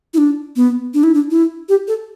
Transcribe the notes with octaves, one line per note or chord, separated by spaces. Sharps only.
E4
D4
B3
D4
E4
D4
E4
G4
A4